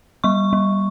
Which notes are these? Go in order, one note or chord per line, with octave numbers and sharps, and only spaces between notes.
G3 C#6
G3